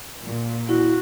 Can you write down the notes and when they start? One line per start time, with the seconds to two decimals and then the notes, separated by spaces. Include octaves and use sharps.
0.23 A#2
0.69 E4 F#4